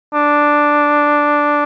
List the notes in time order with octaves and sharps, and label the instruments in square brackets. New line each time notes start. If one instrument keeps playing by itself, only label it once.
[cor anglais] D4